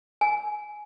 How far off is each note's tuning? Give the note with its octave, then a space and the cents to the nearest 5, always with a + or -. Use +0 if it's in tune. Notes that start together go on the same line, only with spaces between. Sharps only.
G#5 +15